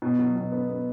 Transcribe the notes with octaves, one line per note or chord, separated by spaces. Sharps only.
B2
F#3
B2
B3
B3